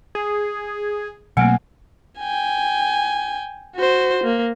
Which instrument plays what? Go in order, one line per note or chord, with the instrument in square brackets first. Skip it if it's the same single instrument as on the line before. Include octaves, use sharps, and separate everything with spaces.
[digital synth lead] G#4
[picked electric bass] B2 F#3 [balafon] A3 A#3 C4 [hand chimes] F#5 G#5
[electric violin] G5 G#5
F#4 C5
A#3